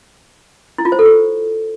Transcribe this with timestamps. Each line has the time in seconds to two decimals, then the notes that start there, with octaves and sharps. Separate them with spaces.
0.78 E4
0.85 F4
0.92 C5
0.99 A4
1.06 G4